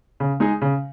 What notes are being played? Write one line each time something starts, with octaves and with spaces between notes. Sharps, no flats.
C#3
G#3 D#4 G#4
C#3